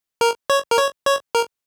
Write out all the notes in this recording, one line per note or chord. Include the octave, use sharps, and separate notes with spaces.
A#4
C#5
A#4
C#5
C#5
A#4